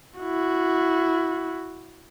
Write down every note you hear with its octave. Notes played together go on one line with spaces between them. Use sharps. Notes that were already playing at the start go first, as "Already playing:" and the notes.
E4 F#4